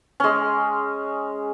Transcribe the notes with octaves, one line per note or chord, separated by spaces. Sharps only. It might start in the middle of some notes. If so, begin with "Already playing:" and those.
G#3 C#4